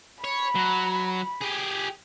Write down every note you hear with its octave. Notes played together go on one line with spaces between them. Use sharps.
C#5 B5
F#3
G4 G#4